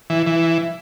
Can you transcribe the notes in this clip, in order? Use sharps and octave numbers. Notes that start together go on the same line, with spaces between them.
E3
E3